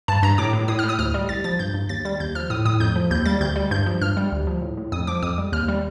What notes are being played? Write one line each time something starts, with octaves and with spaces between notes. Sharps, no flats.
G2 A5
G2 A#5
A2 D6
A2
A2 D#6
A2 F6
D#6
D2 F6
G3
C2 A6
F3 A6
G2 G6
G2
D#2 A6
G3 A6
D#2 G6
F3 F6
A2 D#6
A2 D#6
F2 G6
F3
D#2 G6
G3 A6
D2 G6
G3
G2 G6
F3
G2 F6
G3
D2
F3
A2
A2
F2 D#6
F3 D6
F2 D#6
G3
D#2 F6
G3